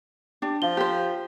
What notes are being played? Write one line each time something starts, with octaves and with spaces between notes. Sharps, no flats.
D4 G4
F3 F5 G7
G4 C5